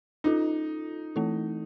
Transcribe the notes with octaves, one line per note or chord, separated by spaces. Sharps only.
C#4 D#4 F4 A4
E3 A3 C4 E4 A4